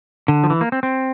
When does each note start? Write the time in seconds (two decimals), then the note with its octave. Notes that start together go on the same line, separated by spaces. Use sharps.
0.28 D3
0.44 F3
0.50 E3
0.61 A#3
0.72 C4
0.83 C4